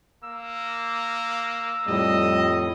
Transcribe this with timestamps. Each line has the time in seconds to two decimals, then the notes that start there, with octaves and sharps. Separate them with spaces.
0.23 A#3 E6
1.87 F2 A2 G3 D#5